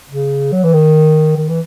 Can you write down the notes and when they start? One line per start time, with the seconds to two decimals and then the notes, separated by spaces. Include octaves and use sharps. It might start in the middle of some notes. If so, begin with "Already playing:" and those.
0.10 C#3
0.52 F#3
0.64 E3
0.73 D#3
1.37 D#3
1.49 E3